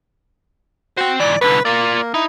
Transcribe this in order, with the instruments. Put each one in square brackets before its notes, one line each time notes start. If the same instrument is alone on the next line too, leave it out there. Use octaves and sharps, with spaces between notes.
[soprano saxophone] F#4 [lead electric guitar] C5 G5
[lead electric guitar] G#2 E3 [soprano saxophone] D5
[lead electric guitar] C2 D3 [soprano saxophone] B4
[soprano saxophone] A#3 [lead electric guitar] F4 D5
[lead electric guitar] D#4 [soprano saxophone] E4